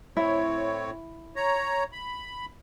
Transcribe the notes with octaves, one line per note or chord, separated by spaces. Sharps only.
A2 C4 E4 C#5
C#5 A#5
B5